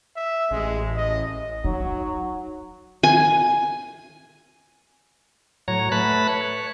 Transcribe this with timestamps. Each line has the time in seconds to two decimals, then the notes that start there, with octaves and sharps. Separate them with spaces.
0.16 E5
0.51 A1 G#3
0.97 D#5
1.64 F#3 D#4
3.03 G#5
5.68 A2 F#3 C#5 A#5
5.92 A3 B4 A5 B5 F#6
6.29 C#5